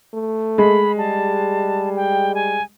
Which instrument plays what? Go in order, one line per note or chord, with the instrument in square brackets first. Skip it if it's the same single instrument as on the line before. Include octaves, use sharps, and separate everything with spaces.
[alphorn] A3
[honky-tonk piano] G#3 [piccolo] B5
[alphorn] G3 [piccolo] A5
[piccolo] G5
G#5